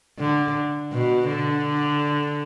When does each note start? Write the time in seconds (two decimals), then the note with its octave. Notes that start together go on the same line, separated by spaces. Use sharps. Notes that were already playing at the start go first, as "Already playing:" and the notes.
0.19 D3
0.92 B2
1.28 D3